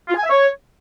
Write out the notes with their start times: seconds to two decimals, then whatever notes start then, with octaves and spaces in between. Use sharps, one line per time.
0.09 F4
0.16 G#5
0.23 E5
0.30 C#5